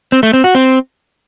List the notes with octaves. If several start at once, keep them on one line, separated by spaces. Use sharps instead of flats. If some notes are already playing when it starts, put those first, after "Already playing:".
C4
A3
C4
F#4
C4